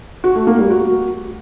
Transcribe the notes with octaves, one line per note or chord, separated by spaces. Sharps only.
F#4
A3
A#3
G3
F#4